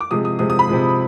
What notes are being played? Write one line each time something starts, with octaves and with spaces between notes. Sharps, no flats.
D6
C3 F3 G#3 D#6
D#6
C3 F3 G#3 D#6
D#6
B5
C3 F3 G#3